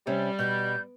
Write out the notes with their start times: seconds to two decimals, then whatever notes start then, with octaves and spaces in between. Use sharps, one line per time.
0.07 C3 G3 C#4
0.39 B2 G6